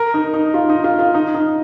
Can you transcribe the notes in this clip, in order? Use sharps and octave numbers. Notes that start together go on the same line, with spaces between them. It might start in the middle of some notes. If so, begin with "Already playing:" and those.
Already playing: A#4
D#4
D#4
F4
D#4
F4
F4
D#4
D#4